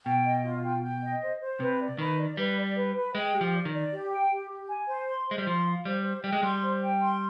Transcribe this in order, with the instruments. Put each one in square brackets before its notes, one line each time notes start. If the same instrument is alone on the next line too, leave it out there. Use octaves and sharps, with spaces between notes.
[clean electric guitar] B2 [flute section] G5
[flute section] D#5
F4
G5
G5
D#5
C5
C5
[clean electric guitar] C3 [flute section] B4
[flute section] D5
[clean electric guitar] D#3 [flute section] B4
[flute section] D5
[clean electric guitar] G3 [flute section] B4
[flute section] D5
B4
B4
[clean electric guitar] G#3 [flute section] G5
[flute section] G4
[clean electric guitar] F3
[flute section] D5
[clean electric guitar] D#3
[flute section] D5
G4
G5
G4
G4
G#5
C5
C6
[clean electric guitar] G#3 [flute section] C5
[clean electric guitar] G3
[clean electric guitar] F3 [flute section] C6
[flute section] F5
[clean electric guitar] G3 [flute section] C5
[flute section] C5
[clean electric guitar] G3 [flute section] G5
[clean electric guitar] G#3
[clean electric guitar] G3 [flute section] C6
[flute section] C5
G5
C6